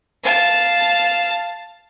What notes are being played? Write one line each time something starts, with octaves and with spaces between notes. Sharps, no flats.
F5 A5